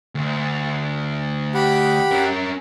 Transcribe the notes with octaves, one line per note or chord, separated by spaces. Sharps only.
D2
G4 F#5 B5
C#4 A#4